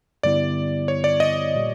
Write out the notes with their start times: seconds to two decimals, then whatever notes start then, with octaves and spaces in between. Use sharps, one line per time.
0.23 G2 D3 G3 B3 E4 D5
0.88 C#5
1.04 D5
1.20 D#5
1.55 A#2 G3